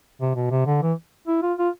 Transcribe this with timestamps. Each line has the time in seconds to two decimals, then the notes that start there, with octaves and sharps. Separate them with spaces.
0.21 C3
0.36 B2
0.51 C3
0.67 D3
0.82 E3
1.27 E4
1.43 F4
1.58 F4